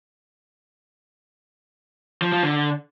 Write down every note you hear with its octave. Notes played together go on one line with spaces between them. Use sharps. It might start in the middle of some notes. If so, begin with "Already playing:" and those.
F3
F3
D3